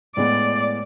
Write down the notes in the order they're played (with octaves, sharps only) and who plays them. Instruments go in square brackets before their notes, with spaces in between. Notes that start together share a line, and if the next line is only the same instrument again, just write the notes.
[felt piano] A2 G#3 B3 [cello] D5